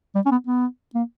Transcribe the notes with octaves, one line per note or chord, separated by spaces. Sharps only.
G3
C#4
B3
B3
A#3